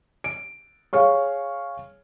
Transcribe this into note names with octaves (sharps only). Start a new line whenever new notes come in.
D7
G#4 C#5 F5 C#6